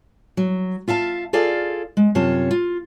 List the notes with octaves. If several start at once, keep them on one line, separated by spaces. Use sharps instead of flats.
F#3
F4 E5 F5 A5
F4 G#4 A4 D5 F5
G#3
F#2 C3 F4 C#5 A5
F4